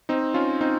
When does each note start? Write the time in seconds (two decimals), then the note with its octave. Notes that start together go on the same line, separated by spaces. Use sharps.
0.09 C4 D#4
0.34 C#4 F4
0.61 C4 D#4